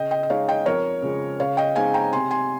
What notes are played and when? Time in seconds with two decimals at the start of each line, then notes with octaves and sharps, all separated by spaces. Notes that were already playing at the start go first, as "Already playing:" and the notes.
Already playing: C#3 D#5 G5
0.11 D#5 G5
0.23 D#5
0.29 G#3 D#4 C#5 F5
0.49 D#5 G5
0.66 F2 A#4 C#5
1.02 C#3 F3 G#3
1.40 C#3 C#5 F5
1.57 D#5 G5
1.75 G#3 C4 D#4 F5 G#5
1.94 G5 A#5
2.12 C3 G#5 C6
2.31 G#5 C6